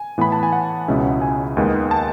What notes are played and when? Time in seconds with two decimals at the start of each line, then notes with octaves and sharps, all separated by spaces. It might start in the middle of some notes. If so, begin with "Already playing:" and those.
Already playing: G#5
0.18 A2 E3 B3 B5
0.32 A5
0.43 G#5
0.53 F#5
0.88 C#2 B2 G#3 C#4 E4
1.22 G#5
1.57 D#2 D#3 G#3 B3
1.91 A5